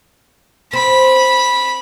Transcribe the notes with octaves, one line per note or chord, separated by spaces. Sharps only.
C4 B5